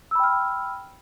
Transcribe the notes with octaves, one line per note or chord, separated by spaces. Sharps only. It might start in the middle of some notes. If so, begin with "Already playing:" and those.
G5 B5 E6 F6